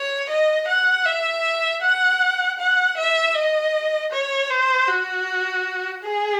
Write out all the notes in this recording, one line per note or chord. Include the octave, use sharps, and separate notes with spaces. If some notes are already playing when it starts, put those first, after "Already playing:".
Already playing: C#5
D#5
F#5
E5
F#5
F#5
E5
D#5
C#5
C5
F#4
G#4